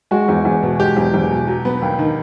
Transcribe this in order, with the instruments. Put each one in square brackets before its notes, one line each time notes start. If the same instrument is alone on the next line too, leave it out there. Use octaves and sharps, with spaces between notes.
[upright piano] G#3 [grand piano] F#4
[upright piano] E2
E2
B2
[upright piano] G#3 [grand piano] G4
[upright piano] E2
E2
B2
F#3
B3
D#2
D#3